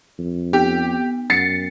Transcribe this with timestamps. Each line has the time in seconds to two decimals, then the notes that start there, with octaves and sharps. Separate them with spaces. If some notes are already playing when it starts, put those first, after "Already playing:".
0.18 F2
0.53 B3 G4
1.30 F#2 A6 C7 C#7